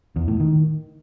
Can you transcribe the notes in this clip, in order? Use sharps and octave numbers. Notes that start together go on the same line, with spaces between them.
E2
A2
D#3